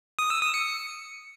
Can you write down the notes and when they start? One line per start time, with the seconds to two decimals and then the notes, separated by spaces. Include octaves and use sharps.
0.19 D#6
0.30 E6
0.42 D#6
0.54 C#7